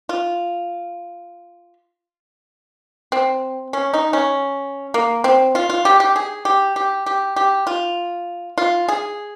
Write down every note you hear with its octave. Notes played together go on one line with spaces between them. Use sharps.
F4
C4
C#4
D#4
C#4
A#3
C4
F4
F4
G4
G4
G#4
G4
G4
G4
G4
F4
F4
G#4